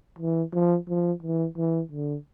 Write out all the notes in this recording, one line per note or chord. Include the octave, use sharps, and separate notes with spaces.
E3
F3
F3
E3
E3
D3